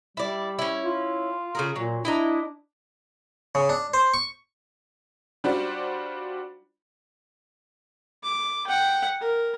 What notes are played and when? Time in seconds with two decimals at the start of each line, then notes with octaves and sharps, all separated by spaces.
0.17 G3 E4 D5
0.59 C#4 E4
0.84 F4
1.55 C#3 G#4 A#4
1.76 A#2 F#3
2.05 D4 E4 D#5 A#5
3.55 C#3
3.69 D4
3.94 C5
4.14 C#6
5.44 G3 D4 F4 F#4 C5 D5
8.23 D6
8.66 F#5 G5
9.20 A#4